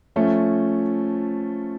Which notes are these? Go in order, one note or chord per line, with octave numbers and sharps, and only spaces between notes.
F3 A3 C#4